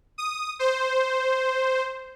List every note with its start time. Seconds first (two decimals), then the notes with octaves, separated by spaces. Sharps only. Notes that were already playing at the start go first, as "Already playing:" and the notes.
0.18 D#6
0.59 C5